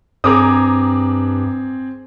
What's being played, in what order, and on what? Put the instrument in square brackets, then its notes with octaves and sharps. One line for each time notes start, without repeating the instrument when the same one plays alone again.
[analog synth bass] G2 [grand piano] C4 G#4 [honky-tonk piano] A#5 D6 D#6